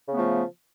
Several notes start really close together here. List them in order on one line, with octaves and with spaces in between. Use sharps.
C#3 B3 A3 F3